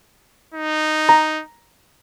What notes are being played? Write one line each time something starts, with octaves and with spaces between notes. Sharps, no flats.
D#4
A#5